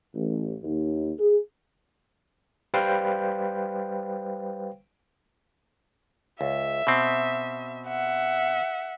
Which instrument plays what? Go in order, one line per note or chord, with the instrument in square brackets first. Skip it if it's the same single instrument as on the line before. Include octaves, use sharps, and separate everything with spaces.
[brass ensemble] A1
D#2
G#4
[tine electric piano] G3 B4 C5 F5 G5
[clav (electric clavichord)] C#2 [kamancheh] E5
[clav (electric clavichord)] B2 C4
[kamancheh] E5 F#5